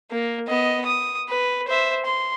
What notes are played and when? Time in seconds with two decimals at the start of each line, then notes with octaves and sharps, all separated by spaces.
0.11 A#3
0.48 B3 D#5
0.86 D#6
1.29 B4
1.68 C5 E5
2.06 C6